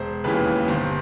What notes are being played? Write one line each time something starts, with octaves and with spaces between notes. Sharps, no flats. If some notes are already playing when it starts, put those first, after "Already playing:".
Already playing: E1 C5
D#2 C#3 E3 B4
G1 C5